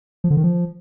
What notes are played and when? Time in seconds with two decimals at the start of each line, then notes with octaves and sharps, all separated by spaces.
0.24 F3
0.30 D3
0.37 D#3
0.43 F3